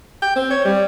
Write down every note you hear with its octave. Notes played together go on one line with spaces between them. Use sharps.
G5
C4
C#5
G3